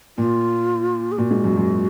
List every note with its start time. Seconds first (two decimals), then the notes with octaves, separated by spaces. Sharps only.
0.18 A#2 F4
1.12 G#4
1.18 A#2 F#4
1.31 G#2
1.44 F#2
1.57 F#2